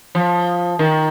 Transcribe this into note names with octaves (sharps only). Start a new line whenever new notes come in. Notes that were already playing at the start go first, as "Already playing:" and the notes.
F3
D#3